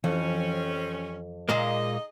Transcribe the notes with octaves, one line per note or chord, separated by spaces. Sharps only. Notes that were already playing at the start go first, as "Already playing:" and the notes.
F2 E3 F3 G3 C4 C#4
A#2 G#3 A#3 D#4 G#4 D#5